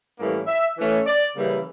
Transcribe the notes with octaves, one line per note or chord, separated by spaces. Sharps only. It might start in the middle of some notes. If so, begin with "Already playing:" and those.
A2 E3 G3 A#3 C#4
E5
E3 A3 C#4
D5
C#3 E3 G3 A#3